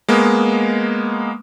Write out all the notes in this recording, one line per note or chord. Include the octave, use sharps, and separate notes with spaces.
G#3 A#3 B3